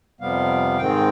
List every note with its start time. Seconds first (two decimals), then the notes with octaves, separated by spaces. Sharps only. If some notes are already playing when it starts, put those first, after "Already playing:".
0.20 F2 C3 G3 B3 F5
0.78 G#2 D#3 G#3 C4 G5